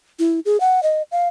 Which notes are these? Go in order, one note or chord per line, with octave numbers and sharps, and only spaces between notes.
E4
G#4
F#5
D#5
F5